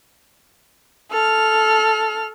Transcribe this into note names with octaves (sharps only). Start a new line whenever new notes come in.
A4 F6